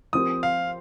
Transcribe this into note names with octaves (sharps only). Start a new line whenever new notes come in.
F3 C4 G4 A#4 D#6
F5